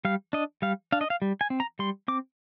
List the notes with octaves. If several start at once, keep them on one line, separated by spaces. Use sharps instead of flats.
G3 F5
D4 D#5
G3 F5
D4 F5
D#5
F5
G3
G#5
C4
A#5
G3 C6
C4 D6